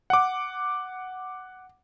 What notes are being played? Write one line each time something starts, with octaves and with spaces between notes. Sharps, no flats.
F#5 D6